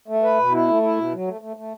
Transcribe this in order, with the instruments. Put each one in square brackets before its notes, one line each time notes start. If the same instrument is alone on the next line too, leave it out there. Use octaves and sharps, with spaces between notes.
[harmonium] A3
B4
B2
E4
A3
E4
B2
F#3
A3
A3
A3